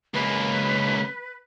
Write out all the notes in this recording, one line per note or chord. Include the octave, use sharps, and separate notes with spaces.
C#2 A#3 B4